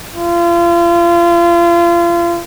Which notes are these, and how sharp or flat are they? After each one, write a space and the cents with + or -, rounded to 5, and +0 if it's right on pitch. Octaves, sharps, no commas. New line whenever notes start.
F4 -35